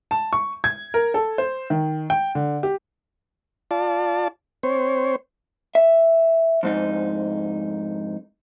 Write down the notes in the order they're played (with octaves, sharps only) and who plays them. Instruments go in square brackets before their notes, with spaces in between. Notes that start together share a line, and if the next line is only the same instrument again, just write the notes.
[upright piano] A5
C#6
G#6
A#4
A4
C5
D#3
G5
D3
G4
[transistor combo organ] F4 D5 A5
C4 C5 C#5
[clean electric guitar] E5
F2 G#2 D#4